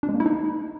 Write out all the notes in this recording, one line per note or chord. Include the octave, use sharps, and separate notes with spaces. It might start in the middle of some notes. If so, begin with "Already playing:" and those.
D4
G#3
A#3
E4
D#4